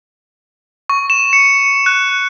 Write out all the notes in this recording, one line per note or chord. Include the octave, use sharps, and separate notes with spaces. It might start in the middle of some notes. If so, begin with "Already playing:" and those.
C#6
E7
C#7
F#6